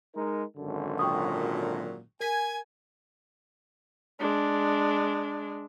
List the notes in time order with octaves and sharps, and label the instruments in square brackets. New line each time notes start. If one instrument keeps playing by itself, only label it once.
[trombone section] G#3 D#4 A#4
G#1 F#2 D3
[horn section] A#2 F#3 [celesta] G5 C#6 D#6
[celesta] A#4 B6 [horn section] G#5
[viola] G#3 D4